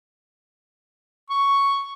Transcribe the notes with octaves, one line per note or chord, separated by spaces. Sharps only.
C#6